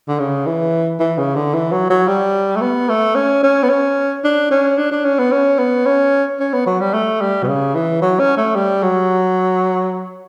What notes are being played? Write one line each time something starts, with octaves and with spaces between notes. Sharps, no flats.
D3
C#3
E3
E3
C#3
D3
E3
F#3
F#3
G3
A3
B3
A3
C#4
C#4
B3
C#4
D4
C#4
D4
D4
C#4
B3
C#4
B3
C#4
C#4
B3
F#3
G3
A3
G3
B2
C#3
E3
F#3
C#4
A3
G3
F#3